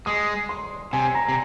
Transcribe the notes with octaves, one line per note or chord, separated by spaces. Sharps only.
G#3 D#6
C6
C3 G#5
A#5
C3